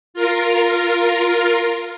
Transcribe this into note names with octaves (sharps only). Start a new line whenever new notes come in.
F4 A#4